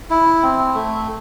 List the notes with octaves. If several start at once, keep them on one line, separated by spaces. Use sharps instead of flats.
E4
C4
A3